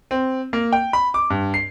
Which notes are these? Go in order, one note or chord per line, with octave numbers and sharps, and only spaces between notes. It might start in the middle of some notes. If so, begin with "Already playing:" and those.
C4
A#3
G5
B5
D6
G2
C7